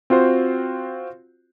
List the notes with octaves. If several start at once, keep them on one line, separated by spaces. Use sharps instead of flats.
C4 F4 F#4 C5